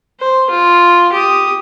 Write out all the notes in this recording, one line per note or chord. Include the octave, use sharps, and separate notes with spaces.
C5
F4
G4 D#6